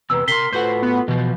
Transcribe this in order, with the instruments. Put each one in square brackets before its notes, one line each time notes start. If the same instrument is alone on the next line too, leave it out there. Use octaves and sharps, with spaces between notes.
[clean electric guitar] E2 C3 [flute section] B4 [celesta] A#5 E6
[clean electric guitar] C3 C6 [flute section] A#4 F6 [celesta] B6 C7 G7
[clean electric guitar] A2 F#4 F#5 [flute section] F4 A4 B4 [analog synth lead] C5
[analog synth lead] B3
[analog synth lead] B2 [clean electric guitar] E3 F3